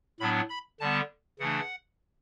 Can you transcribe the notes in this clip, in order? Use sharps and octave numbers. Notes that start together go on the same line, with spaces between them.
A2 F#3 B3 D4 B5
B5
D3 G3 B3 A5
C#3 E3 A3 D4 F#5